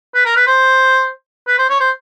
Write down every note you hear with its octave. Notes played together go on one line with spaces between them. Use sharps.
B4
A#4
B4
C5
B4
C5
C#5
C5